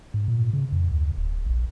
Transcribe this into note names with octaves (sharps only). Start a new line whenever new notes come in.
G#2
A#2
C#3
F2
D2
D1
A#1